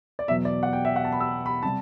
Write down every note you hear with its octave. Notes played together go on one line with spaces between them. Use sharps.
D5
E2 B2 F#3 E5
D5
F#5
G5
E5
F#5
A5
B5
E6
B5
C3 G3 A5